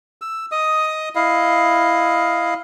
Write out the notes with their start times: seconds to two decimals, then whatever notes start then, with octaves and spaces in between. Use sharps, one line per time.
0.22 E6
0.52 D#5 D#6
1.15 E4 D#5 F5